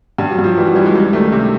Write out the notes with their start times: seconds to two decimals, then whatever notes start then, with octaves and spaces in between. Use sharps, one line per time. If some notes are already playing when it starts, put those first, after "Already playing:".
0.18 G2 G3
0.31 F#3
0.39 G2
0.44 F3
0.57 E3 G3
0.66 F#3
0.75 E3 G3
0.86 G#3
0.94 C#2 G3
1.13 D#3 A3
1.32 C3